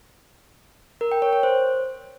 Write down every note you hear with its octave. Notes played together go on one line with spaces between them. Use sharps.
A#4
G5
C#5
C#5
C5